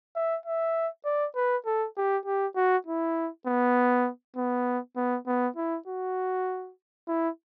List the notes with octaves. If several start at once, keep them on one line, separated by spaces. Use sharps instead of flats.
E5
E5
D5
B4
A4
G4
G4
F#4
E4
B3
B3
B3
B3
E4
F#4
E4